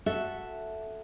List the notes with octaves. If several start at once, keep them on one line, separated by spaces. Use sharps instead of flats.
F#4 A4 E5